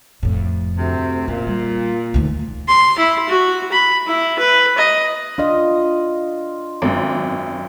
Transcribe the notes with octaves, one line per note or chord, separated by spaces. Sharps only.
F2 A2
D2 C3
A#2 C#4
G3
D2 D#3
C6
E4
F#4
B5
E4
B4
D#5
D4 F4 D#5
G#1 F#2